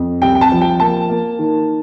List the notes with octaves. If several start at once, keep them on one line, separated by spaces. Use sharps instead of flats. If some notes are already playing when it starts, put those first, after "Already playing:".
Already playing: F2
C2 G5
G5
A5
F3
G5
A#3 A5
A#3
D#3